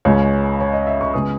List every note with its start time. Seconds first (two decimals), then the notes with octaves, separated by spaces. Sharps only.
0.05 C#2 C#3 G#3 C#5
0.60 C#5
0.73 D#5
0.87 E5
1.01 C#6
1.13 C#3 G#3 B3 D#6